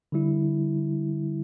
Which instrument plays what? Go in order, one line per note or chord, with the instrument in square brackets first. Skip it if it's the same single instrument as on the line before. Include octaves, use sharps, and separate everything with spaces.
[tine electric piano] D3 G3 E4